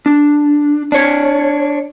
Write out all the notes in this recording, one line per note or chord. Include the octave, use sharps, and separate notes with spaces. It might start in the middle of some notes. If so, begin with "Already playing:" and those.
D4
D4 C#5